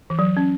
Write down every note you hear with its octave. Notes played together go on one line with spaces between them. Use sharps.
E3
F#3
C#4